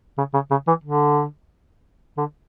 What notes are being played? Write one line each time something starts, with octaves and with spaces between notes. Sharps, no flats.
C#3
C#3
C#3
E3
D3
D3